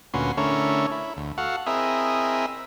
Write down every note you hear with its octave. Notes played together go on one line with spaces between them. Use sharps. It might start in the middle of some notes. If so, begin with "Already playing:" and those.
D2 A#2 C#4 F#4 B4 C6
D3 A3 C#4 E4 A#4 C#5
E4
D2
F#4 A4 F5 F#5
C4 E4 G#4 A#4 D#5 E5